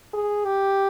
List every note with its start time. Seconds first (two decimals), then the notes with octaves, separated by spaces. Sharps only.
0.14 G#4
0.45 G4